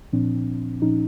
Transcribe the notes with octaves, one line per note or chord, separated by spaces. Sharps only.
A#2 F3 C4 D4
A#2 F3 C#4 D#4